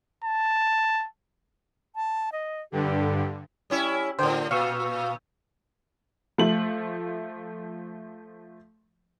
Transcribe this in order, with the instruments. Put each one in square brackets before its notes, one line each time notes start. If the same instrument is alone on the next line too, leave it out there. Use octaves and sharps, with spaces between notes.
[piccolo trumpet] A5
[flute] A5
D#5
[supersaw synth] G2 D3 [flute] G4
[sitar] G3 C#4 E4
[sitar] A2 D3 [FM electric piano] C5 G5
[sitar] A#2 [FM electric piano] F5 C#6 E6
[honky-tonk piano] F3 A3 F#7